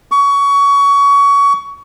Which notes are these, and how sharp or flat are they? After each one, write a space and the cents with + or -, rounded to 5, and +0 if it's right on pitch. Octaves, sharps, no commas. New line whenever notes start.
C#6 +25